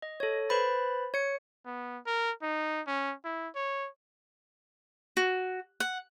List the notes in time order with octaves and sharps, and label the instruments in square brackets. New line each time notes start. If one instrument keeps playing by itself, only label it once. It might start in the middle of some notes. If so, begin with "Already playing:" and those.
[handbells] D#5
A4 C#5
B4 C5 B5 A6
C#5 C#7
[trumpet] B3
A#4
D#4
C#4
E4
C#5
[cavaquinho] F#4
F#5